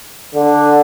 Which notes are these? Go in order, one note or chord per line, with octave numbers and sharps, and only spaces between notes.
D3